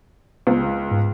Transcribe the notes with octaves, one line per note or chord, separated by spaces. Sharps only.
C#2 B3
G#2